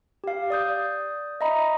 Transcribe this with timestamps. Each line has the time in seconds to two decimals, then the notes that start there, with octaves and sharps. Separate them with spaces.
0.24 G4 F5
0.50 D5 D#6 G6
1.41 D#5 E5 A#5 B5